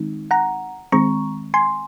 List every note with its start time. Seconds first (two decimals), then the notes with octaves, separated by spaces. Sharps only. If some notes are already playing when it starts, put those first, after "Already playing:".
Already playing: D#3 G#3 C4 D#4
0.31 F#5 A#5
0.92 D#3 G#3 C4 A#5 C#6
1.54 G#5 C6